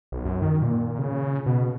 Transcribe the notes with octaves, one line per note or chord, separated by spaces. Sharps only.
B1
F#2
D#3
A#2
C#3
B2